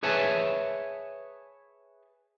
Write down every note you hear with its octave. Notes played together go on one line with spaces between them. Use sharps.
G#4 B4 C#5 E5 G#5 A5